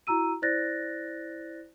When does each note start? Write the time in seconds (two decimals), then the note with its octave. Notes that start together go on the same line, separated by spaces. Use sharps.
0.07 E4 F#4 A#5 E6 D#7
0.42 E4 C5 D5 F#6 A6 A#6